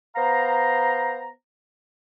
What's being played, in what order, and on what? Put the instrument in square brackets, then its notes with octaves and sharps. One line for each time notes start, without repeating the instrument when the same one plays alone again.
[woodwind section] B3 C5 F5 A#5